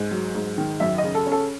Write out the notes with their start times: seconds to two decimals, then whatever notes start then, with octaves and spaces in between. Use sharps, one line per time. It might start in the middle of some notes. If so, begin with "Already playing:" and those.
Already playing: G#2
0.11 F#3
0.35 G#2
0.58 D#3
0.80 F#2 E5
0.98 D#5
1.04 C#3
1.15 A4
1.26 C#4
1.32 A4